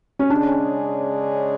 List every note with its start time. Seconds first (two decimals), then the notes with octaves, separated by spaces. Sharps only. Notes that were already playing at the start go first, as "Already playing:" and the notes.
0.19 C#4
0.30 C#3 G#3 C#4 D4 G#4 D5